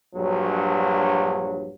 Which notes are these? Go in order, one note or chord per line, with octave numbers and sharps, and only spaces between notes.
A#1 G2 F#3